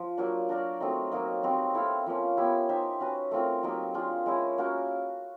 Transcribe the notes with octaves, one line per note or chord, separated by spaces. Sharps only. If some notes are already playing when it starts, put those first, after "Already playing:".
Already playing: F3
F#3 A#3 D4
D4 F#4 A#4 D5
F#3 A3 C4 D#4
F#3 A#3 D#4
G3 C4 D#4 F#4
E4 A4 C5 F5
F3 A#3 C#4
B3 E4 G4
D#4 G4 C5 E5
C#4 F#4 B4
A3 C4 F4 A#4
F#3 A#3 D#4 G4
D4 F4 G#4
G#3 C#4 E4 G#4
A#3 C#4 F#4 A#4